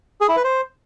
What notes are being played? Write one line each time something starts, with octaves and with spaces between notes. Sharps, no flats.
G#4
E4
B4
C5